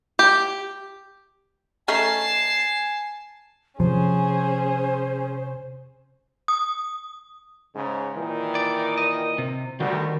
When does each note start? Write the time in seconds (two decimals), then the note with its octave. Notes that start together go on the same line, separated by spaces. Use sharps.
0.19 G4
1.88 A3 C#4 D#4 G#5 A5 C7
3.80 C3 F3 C#4 G#4 C5
6.48 D#6
7.75 G#2 C#3
8.16 A#2 D#3 E3
8.55 D5
8.98 D#5
9.38 C3
9.80 D2 D#3 G3 F#4